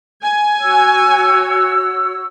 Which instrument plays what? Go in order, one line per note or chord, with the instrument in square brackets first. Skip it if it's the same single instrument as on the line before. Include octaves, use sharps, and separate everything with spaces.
[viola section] G#5
[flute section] F#4 C#5 E6